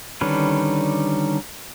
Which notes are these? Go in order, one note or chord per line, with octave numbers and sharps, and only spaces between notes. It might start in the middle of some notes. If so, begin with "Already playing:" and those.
D3 D#3 G3 C#4 B4